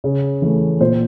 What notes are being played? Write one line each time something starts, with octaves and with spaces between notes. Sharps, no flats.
C#3
E3 A3
A#2 C5